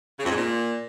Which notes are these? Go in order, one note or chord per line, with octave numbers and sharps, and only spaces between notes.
C#3
F2
G#2
A#2